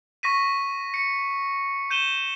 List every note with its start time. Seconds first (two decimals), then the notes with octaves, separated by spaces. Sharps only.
0.23 C#6 A#6 B6 D#7
0.94 C#7
1.91 G6 D#7 E7 G7